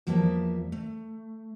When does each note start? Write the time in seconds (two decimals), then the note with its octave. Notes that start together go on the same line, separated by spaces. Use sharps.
0.07 E2 F3 G3 A#3 E5 A5
0.72 A3